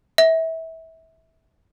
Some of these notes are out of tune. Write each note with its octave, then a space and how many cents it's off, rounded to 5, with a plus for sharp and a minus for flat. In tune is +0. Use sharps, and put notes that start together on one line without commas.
E5 -25